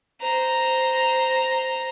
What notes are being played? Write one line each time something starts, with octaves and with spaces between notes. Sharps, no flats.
C5 A#5